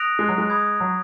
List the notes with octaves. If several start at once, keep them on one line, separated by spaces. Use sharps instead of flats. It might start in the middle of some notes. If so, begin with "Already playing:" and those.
Already playing: D#6 F#6 A#6 D7 F7
G#3
F#3
G#3
B5 D#6 G#6
F#3